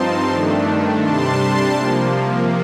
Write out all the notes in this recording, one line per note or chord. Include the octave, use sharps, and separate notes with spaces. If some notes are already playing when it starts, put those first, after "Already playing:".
Already playing: G2 F3 C4 D#4 A5 C6
G2 D#3 A3 D4
C3 G3 D4 A5 C6
C3 F3 A#3